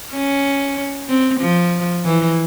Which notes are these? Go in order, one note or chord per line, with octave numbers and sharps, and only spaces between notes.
C#4
C4
F3
E3